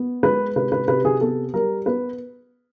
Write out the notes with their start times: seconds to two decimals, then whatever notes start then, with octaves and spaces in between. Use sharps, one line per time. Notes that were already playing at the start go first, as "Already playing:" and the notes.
Already playing: B3
0.23 G#3 B4
0.56 C3 B4
0.72 B4
0.88 C3 B4
1.05 G#4
1.21 B3 A4
1.54 G3 A#4
1.86 B3 B4